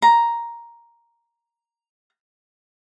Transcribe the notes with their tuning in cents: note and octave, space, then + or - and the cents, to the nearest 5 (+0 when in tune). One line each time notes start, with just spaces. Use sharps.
A#5 +5